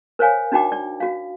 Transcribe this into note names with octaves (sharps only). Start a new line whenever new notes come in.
A#4 C5 C#5 F5 G#5
D4 D#4 F#4 G5 A#5 D6
D5
F#4 F5